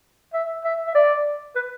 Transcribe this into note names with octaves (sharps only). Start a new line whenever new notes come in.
E5
E5
E5
D5
B4